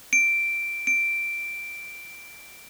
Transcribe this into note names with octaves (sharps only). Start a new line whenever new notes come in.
D7
D7